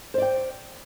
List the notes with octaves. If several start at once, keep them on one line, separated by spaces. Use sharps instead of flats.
C5 D5 G5